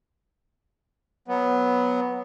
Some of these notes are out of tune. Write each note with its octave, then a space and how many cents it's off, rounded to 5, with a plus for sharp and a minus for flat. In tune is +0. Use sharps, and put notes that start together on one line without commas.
F#3 +0 B3 +0